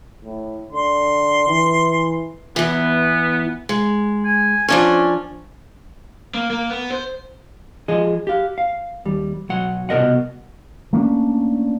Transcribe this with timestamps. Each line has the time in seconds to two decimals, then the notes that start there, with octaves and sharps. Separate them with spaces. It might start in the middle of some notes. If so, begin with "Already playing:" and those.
0.24 A2
0.72 D3 C6
1.49 E3
2.56 E2 E3 B3
3.69 G#3
4.25 G#5
4.68 F3 C#4 D4 G#5
6.35 A#3
6.50 A#3
6.70 B3
6.91 C5
7.88 F3 G#4 D#5
8.27 G4 F5
8.58 F5
9.05 D#2 G3
9.49 B1 F#3 F#5
9.89 C2 B2 A#4 D#5 F#5
10.93 A3 A#3 C#4 D4